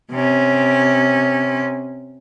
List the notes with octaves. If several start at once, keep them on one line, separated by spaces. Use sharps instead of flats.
C3 C#4